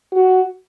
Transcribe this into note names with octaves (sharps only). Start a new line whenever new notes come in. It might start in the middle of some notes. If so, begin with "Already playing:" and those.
F#4